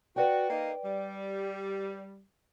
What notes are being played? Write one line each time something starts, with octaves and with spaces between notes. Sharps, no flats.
F#4 B4 D5 G5
A#3 D#4
G3